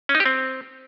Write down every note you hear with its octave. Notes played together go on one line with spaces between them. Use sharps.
C#4
D#4
G4
C4